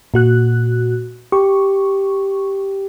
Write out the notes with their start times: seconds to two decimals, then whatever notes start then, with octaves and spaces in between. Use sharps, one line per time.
0.14 A#2 F#4 F#6
1.32 G4 C#6